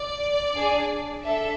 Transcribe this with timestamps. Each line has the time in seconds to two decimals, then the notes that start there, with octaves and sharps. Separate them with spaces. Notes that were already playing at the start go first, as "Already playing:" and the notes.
Already playing: D5
0.55 D4 G#4
1.25 D4 A4 E5